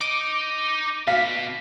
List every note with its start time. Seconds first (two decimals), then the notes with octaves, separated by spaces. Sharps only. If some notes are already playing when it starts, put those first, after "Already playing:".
0.01 D#4 D#5 D6
1.07 B2 F5 B6